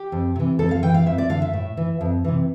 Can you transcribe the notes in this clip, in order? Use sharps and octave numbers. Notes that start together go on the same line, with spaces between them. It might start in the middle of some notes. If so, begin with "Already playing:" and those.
Already playing: G4
F2
C3 E3
F2 A4
F5
E3 G5
F5
F2 E5
D5
D3 F5
E5
A2
E3
F2
C3 E3